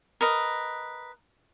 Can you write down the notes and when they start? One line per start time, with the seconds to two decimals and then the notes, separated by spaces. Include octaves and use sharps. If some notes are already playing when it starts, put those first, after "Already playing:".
0.21 A#4 B4 D#5